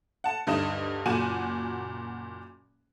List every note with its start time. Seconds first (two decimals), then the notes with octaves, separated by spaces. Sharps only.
0.24 F#5 A5
0.47 D2 G2 D#4 D#5 E7
1.06 F#1 A#2 F#4 G#5 D#7 E7